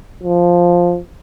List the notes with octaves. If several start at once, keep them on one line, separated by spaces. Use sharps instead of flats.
F3